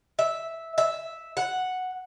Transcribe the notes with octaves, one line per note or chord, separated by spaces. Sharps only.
E5
E5
F#5